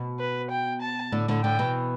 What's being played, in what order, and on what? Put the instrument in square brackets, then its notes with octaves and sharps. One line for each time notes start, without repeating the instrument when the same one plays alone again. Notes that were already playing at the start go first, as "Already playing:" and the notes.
Already playing: [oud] B2
[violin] B4
G5
A5
[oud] A2 D3
A2 D3
[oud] A2 D3 [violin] G5
[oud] B2 E3